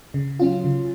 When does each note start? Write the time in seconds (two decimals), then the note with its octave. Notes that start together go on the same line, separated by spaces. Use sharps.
0.14 C#3
0.40 F#3 C#4 F4
0.64 C#3